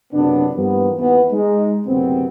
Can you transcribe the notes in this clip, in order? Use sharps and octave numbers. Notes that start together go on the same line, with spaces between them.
F#1 C3 F#3 B3 D4
G2 E3 F3 A#3 B3
D#2 E3 B3
G#3 D#4
F#1 D2 C3 B3 C4